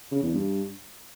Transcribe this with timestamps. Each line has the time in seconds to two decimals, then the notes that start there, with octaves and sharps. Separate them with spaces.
0.12 C#3
0.23 E2
0.34 G2